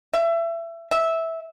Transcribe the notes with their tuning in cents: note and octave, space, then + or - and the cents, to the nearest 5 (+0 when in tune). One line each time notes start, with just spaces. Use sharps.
E5 +25
E5 -10